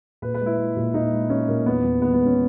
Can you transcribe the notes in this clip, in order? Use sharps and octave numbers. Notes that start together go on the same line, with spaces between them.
A#2 B4
B4
G#3
E4
G#3
A#2
A#2 D#4
G#3
G#3 C#4
A#2 A#3
E2 B3
E2
D#3 B3
B3
G#3
C#4